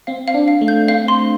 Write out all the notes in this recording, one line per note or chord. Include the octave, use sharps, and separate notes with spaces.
C4 F5
F5
D4
F5
A3
G6
C4 F5
C6